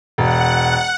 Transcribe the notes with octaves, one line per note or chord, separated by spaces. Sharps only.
E1 F#5